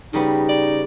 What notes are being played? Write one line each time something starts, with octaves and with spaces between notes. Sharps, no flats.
C#3 G3 B3 D#4
D5